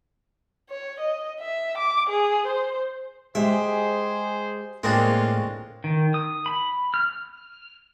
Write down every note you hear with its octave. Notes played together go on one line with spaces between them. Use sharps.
C#5
D#5
E5
D6
G#4
C5
G#3 G4 G#4 C5 E5
A2 G#3 A#3 C4 D4 F4 C#5
D#3
D#6
B5
F6